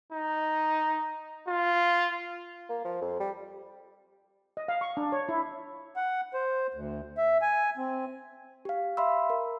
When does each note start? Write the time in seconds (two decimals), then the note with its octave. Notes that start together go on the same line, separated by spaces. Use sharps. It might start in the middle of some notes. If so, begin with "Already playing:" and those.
0.13 D#4
1.48 F4
2.70 A#3
2.85 F3
3.01 F2
3.20 G3
4.57 D#5
4.68 F5
4.81 C#6
4.97 D4
5.12 C#5
5.29 E4
5.96 F#5
6.34 C5
6.74 D2
7.18 E5
7.42 G#5
7.77 C4
8.65 G4 F5
8.97 E5 F5 B5 C6 E6
9.30 A#4